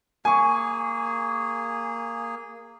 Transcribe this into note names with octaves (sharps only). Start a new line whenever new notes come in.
A#3 G#4 G#5 C#6